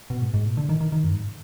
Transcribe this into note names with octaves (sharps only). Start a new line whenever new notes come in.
B2
G#2
G#2
A#2
D3
D#3
D#3
D#3
F#2
G#2